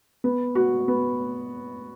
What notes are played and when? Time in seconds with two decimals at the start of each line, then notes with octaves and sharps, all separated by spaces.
0.24 B3
0.55 F#4
0.88 B3